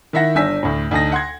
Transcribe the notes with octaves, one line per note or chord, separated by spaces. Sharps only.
D#3 E4 E5 F#5 A#6
G1 D4 G#5 E6 B6
D2 A2
D2 D#4 A5 D#6 A#6
F#5 C6 G#6